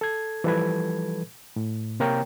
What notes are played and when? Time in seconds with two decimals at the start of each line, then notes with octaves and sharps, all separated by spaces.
0.01 A4 G#6
0.44 E3 F3 G3 A4 B4 G#6
1.56 A2
2.00 C3 A#3 A#4 C#5 G5 A#5